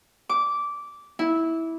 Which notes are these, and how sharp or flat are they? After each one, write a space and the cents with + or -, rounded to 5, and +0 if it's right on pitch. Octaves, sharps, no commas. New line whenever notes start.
D6 -15
E4 -15